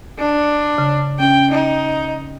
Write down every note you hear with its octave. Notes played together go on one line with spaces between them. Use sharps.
D4
C#3
C#4 G5
D#4